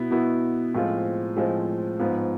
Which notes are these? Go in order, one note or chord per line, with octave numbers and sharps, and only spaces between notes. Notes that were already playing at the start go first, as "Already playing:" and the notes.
Already playing: B2 B3 E4
B2 B3 E4
A2 F3 G#3 C4 F4
A2 F3 G#3 C4 F4
G#2 F3 B3